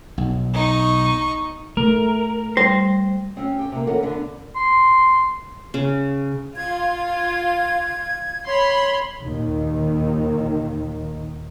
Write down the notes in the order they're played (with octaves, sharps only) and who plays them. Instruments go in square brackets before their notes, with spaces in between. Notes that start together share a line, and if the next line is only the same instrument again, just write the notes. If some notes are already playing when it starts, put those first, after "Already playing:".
[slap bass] B1
[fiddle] D#4 C#6
[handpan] A3 [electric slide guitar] A#4
[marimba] G3 [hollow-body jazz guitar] C5
[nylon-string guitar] C4 C#4
G4 G5
C3 A#3
E2 E3 C#4 A4 A#4 F#5
D3 B3 D4 B4
[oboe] C6
[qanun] C#3
[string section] F4 [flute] G#6
[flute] C#5 [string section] B5 C6
[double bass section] D#2 A#2 D#3